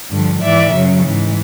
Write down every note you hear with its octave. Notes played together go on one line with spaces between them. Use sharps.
G2 D3 F3
G#2 E3 D5 E5
F#2 C#3 F#3
G#2 E3